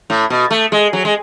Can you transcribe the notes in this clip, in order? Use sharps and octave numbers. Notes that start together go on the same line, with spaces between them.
A2
B2
A3
G#3
F#3
G#3